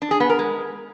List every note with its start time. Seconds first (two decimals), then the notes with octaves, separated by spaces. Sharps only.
0.02 D4
0.11 G#4
0.20 B3
0.29 A#4
0.39 G#3